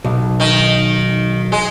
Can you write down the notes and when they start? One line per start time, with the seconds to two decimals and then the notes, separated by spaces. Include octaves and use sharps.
0.05 B1
0.40 D#3 D#4
1.52 G#3